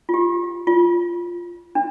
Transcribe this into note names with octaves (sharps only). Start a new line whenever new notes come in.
F4
G4
F4
D4